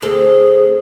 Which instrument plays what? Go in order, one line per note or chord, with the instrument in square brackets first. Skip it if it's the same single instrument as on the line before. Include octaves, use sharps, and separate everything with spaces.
[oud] D2 C4 A4 [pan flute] G#4